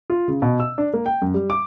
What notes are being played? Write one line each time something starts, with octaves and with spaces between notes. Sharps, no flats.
F4
C#3
B2
E6
D4
A#3
G5
F#2
G3
D6